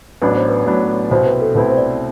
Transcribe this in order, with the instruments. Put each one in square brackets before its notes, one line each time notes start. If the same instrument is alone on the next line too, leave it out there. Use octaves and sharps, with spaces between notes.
[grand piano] A1 A2 F#3 B3 D4 [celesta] B4
[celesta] C5
B4
[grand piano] A1 A2 F#3 B3 D4
[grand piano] C2 B2 A3 C4 E4 [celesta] C5
[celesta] B4
A4
[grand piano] C2 B2 A3 C4 E4 [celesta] B4
[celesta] C5
D5